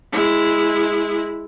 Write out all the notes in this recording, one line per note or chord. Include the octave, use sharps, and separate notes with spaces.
G#3 E4